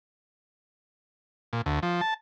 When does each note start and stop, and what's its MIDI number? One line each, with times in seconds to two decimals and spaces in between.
1.53 1.62 46
1.66 1.80 38
1.83 2.01 53
2.01 2.14 81